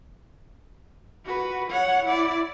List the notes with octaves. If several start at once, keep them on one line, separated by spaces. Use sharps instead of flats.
F#4 B4
C#5 F#5
E4 D5